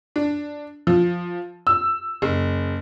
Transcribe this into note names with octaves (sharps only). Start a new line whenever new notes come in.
D4
F3
E6
F#1